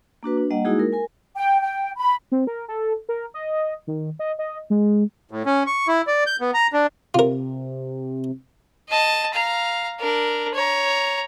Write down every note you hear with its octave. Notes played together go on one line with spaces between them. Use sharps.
A#3 D4 F#4 B4
D4
G3 A#3 D#5 F#5
G#3 A#3 D#4 E4 F#4 G#4
A#4
A#4 G#5
G5
G5
B5
C4
A#4
A4
A#4
D#5
D#3
D#5
D#5
G#3
A2
C#4
C#6
E4
D5
G6
B3
A#5
D4
C3 F4 A#4
D#5 A5
F5 A#5
D4 A#4
C#5 A#5